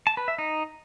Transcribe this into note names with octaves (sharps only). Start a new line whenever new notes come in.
A5
B4
E5
D#4